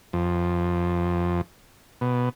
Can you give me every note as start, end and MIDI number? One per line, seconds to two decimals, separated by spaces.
0.13 1.41 41
2.01 2.29 47